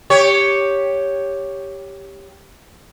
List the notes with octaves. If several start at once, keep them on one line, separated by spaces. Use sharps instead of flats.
G4 C#5